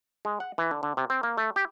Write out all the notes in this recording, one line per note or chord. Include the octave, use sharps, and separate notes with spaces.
G#3
F#5
E3
D3
D3
C3
C4
A#3
A3
G4